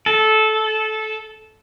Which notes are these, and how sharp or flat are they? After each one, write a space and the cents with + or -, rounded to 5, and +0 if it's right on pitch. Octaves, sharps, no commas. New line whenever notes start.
A4 -15